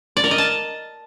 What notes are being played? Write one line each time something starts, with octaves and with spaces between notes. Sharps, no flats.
D5
A#4
D#5
A5